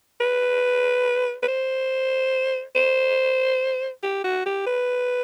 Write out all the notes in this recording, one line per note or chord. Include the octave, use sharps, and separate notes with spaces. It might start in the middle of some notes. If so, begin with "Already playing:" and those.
B4
B4
C5
C5
G4
F#4
G4
B4